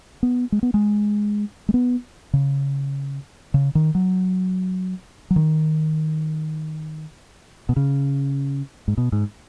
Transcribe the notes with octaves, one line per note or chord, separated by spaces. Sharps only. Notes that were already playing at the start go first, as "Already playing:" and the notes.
B3
G#3
B3
G#3
G#3
B3
C#3
C#3
D#3
F#3
F#3
D#3
B2
C#3
G#2
B2
G#2